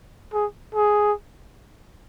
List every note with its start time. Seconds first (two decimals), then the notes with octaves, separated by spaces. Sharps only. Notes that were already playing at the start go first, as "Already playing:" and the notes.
0.33 G#4
0.75 G#4